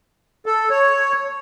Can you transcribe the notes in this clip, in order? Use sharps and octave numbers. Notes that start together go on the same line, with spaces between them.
A4
C#5